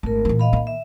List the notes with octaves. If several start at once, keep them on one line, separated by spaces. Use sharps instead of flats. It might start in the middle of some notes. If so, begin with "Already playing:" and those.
G#1 A3 A#4
A#2 E3
D#5 F5 B5
D#3 A#3
E5